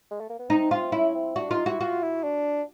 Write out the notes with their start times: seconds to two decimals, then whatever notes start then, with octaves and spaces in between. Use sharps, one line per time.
0.11 G#3
0.20 A3
0.30 A#3
0.39 B3
0.50 C4 D#4
0.71 F4
0.92 C#4 E4
1.15 C4
1.36 D4 F#4
1.50 D#4 F4
1.66 E4 F#4
1.80 F4 F#4
2.02 E4
2.23 D4